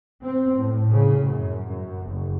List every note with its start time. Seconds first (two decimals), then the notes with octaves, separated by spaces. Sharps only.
0.23 C4
0.58 A2
0.91 C#3
1.26 F#2
1.67 F#2
2.05 F#1